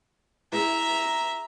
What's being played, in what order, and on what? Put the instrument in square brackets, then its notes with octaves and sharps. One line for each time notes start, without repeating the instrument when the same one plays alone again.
[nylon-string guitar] E4 G#4 [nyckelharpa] E5 A#5